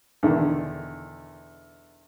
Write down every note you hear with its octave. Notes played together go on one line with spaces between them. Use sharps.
E2 B2 D3 D#3